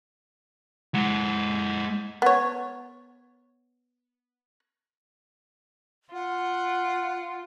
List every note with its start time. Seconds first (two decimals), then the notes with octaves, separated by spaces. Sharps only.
0.95 G#3 F#5
2.22 B3 C#5
6.14 F4 F#5